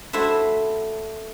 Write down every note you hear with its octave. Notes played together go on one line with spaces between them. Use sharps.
A3 E4 F#4 C5 E5